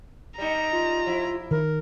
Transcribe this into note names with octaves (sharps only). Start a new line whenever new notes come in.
G3 D#4 A#5
F4
F3 E4
D#3 A#4